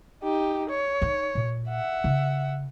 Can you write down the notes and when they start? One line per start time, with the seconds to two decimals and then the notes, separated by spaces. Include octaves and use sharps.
0.24 D#4 G4
0.70 C#5
1.02 D#4
1.35 A#2
1.69 E5 F#5
2.04 C#3